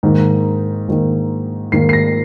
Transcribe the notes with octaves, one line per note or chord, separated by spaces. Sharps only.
G#2 D#3 A#3
G#2 D#3 A#3
G#2 D#3 A#3 C7
C7
A#6